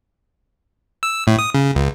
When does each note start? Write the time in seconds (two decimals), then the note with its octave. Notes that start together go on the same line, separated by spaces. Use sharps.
1.03 E6
1.27 A2
1.39 D#6
1.54 C#3
1.75 C#2